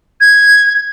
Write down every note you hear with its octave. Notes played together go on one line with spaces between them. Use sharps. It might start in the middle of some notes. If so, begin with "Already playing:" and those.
G#6